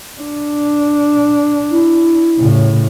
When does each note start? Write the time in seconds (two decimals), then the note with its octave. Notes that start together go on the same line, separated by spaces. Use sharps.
0.20 D4
1.71 E4
2.39 A2 C#3